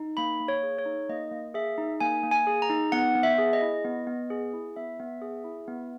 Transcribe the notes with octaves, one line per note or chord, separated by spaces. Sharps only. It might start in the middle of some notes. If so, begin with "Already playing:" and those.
Already playing: D#4
A#3 B5
A#3
C#5
G#4
C#5
D#4
A#3 D#5
A#3
G#4 E5
D#4
A#3 G#5
A#3
G#5
G#4
A#5
D#4
B3 F#5
B3
E5
G#4
D#5
E4
B3
B3
G#4
E4
B3 E5
B3
G#4
E4
B3